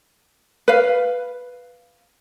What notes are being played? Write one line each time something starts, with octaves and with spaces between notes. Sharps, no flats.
B4 F5